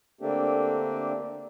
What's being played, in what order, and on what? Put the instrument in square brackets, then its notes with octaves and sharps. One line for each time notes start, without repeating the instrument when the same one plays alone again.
[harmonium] D3 A3 A#3 C4 D4 G4